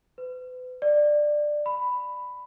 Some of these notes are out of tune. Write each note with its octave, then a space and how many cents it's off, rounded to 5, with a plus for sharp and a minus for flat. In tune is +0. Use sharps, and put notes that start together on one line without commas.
B4 +40
D5 +15
B5 +10